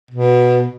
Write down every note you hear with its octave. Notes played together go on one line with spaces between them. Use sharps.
B2